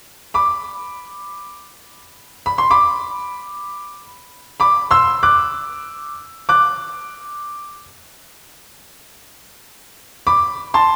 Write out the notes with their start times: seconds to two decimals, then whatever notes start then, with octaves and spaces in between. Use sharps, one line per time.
0.34 B5 D6
2.46 B5
2.58 C6
2.71 B5 D6
4.60 B5 D6
4.91 C6 E6
5.23 D6 F#6
6.49 D6 F#6
10.27 B5 D6
10.74 A5 C6